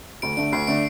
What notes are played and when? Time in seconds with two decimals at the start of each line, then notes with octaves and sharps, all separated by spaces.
0.22 D2 D7
0.37 D3 A3 D4 D7
0.52 D2 C7
0.67 D3 A3 D4 D7